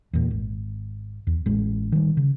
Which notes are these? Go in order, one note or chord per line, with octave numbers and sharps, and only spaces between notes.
E2 A#2
G#1
E2
A1 G#3
D#3 G3
C#3